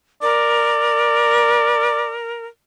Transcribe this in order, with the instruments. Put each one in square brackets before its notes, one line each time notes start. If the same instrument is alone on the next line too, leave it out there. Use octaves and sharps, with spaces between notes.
[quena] A#4 [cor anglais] D5